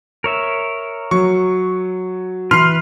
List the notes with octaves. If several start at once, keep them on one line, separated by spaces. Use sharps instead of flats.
A#4 C#5 E5
F#3 C#6
E3 B4 C6 F6 C7